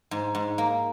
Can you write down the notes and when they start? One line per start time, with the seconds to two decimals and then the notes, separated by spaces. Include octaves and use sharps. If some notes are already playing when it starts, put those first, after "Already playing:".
0.11 G#2
0.35 G#2
0.58 A#3